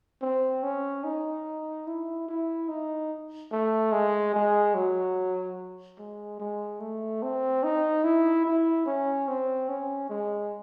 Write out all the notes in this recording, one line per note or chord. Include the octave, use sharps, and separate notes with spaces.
C4
C#4
D#4
E4
E4
D#4
A3
G#3
G#3
F#3
G#3
G#3
A3
C4
D#4
E4
E4
C#4
C4
C#4
G#3